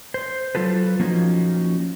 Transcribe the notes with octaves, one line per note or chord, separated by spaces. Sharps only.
C5
F#3 F4 A4 B4
F3 A#3 C#4 D#4 F4 F#4